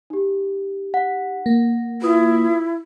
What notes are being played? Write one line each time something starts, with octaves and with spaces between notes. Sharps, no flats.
D#4 G4
F#5
A#3
E4 F4 B4 D#6